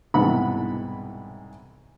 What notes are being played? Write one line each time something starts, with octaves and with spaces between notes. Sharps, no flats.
C2 G#2 B2 E3 F#5 B5